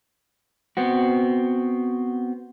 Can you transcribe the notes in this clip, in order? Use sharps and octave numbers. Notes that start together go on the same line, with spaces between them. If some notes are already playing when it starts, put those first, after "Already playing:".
B3 C4 F#4